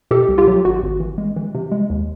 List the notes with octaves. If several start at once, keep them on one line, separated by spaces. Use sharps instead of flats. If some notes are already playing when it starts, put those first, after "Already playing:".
B2 G4 A4
C2
F4 G4
F#3
G#1 F#4
G#1
E3
G#3
E3
C3
G#3
D#2